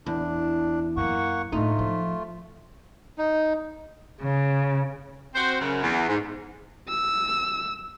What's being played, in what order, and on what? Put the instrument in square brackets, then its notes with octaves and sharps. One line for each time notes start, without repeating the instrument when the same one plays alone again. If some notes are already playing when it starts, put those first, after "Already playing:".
[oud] E2 [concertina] D4
[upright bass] F#2 [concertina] A#3 F#5 C#6
[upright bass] A2 D3 [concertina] A3 F4 [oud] D#4
[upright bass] F3
[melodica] D#4
[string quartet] C#3
[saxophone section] C4 F#4 C5
F#2 C#3
E2
G#2
[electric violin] E6